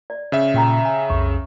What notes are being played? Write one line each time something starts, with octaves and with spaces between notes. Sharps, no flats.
D5
C#3 E5
A#2 G4 G5 A#5
G#5
B1 F2 C#6